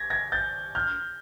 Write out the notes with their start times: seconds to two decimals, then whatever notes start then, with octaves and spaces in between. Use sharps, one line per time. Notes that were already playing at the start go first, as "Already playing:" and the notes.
Already playing: G#6 A#6
0.10 G#6 A#6
0.32 G6 A6
0.75 F6 G6